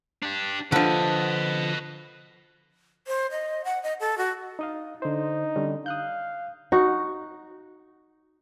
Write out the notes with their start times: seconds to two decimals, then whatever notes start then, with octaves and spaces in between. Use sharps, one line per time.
0.23 D4 G4
0.72 D3 F3 B4 D#5
3.07 C5
3.31 D#5
3.65 F#5
3.83 D#5
4.00 A4
4.18 F#4
4.59 D#4 D#5 F5
5.02 D3 D#4 C5
5.56 D3 G3 C#4
5.86 F5 D#6 F#6 G6
6.72 D#4 F#4